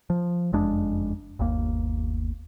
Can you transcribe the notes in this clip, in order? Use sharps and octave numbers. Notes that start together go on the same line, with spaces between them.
F3
F#1 F2 G#3 D4
G1 D#2 A#3